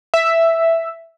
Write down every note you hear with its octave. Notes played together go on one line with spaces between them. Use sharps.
E5